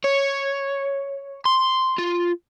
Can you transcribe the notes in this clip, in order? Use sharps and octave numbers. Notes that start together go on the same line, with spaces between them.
C#5
C6
F4